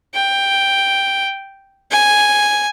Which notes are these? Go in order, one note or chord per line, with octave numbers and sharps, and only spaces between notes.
G5
G#5